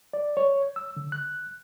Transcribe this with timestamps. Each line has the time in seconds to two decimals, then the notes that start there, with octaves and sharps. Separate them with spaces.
0.13 D5
0.37 C#5
0.76 E6
0.97 D3
1.12 F#6